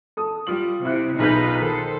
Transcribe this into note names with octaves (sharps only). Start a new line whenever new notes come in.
A4 D#6
G3 F4 F#7
C3 E4 F#6
B1 D#4 F4 G#4 B4 G6
D#3 A4 C5